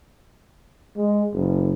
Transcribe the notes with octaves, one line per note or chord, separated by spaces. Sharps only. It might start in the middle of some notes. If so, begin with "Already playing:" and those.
G#3
F#1